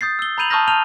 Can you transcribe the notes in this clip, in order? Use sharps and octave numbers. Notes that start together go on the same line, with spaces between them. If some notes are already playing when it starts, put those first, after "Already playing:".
D#6 G6 A6 C7
E6 G7
A#5 B5 G6 D#7 F7 F#7
A5 C#6 D#6 F6 G6 A#6
A5 F6 G6 D#7 F7 G7